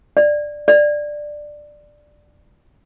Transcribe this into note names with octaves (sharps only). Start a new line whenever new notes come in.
D5
D5